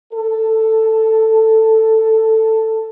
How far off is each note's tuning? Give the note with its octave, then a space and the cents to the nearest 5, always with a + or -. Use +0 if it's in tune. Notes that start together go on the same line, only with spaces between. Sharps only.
A4 +10